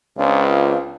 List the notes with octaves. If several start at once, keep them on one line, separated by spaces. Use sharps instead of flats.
C#2 C4 D4 F4